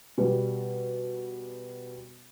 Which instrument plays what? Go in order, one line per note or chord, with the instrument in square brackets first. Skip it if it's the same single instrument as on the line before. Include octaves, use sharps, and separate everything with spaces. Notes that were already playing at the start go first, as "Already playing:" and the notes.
[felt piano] B2 G3